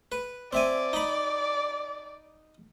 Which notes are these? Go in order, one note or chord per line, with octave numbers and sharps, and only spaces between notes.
B4
C4 D5 E5 G#5
D#4 B5